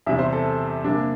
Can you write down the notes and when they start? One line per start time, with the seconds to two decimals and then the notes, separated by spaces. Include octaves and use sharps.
0.06 E2 C3 G3 E5
0.19 C5
0.33 A4
0.84 C3 G3 A#3 D4